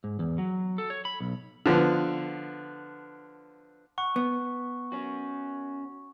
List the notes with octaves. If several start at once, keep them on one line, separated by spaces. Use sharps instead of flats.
G#2
E2
F#3
A4
C#5
B5
B1
D3 F3 B3
F#5 C#6
B3
C#4 F#4